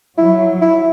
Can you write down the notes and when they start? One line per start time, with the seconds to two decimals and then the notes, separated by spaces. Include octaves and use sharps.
0.18 F#3 E4
0.61 E4